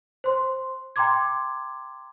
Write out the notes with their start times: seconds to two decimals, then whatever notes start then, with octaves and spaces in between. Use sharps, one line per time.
0.24 C5 C6
0.96 G5 A#5 C6 D6 G#6